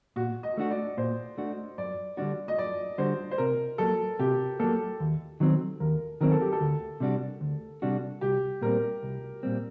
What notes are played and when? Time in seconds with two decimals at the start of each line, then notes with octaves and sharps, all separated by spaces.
0.16 A#2 F#4
0.43 D#5
0.57 A3 D4 F#4
0.71 D5
0.97 A#2 C5
1.38 A3 D4 F#4
1.78 F#2 D5
2.17 D3 G3 D4 F#4 D5
2.48 D#5
2.58 F#2 D5
2.98 D3 G3 D4 F#4 C5
3.31 C5
3.38 C3 A#4
3.78 F#3 A#3 A4
4.19 C3 G4
4.60 F#3 A#3 A4
5.00 D#2
5.40 D#3 F#3 C4
5.80 D#2 A#4
6.21 D#3 F#3 C4 A#4
6.31 A4
6.41 G4
6.52 A4
6.61 D2
7.00 C3 G3 D4 F#4
7.41 D2
7.82 C3 G3 D4 F#4
8.21 C2 G4
8.61 A#2 G3 C4 A#4
9.03 C2
9.43 A#2 G3 C4